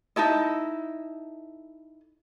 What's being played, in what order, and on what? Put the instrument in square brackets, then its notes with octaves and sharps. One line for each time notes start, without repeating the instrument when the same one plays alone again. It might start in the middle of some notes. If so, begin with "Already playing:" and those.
[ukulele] D#4 E4 A4 D#5